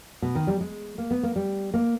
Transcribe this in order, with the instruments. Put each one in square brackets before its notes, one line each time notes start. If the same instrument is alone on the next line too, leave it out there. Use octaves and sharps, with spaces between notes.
[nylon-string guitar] B2
D#3
G3
G#3
A#3
B3
A#3
G3
A#3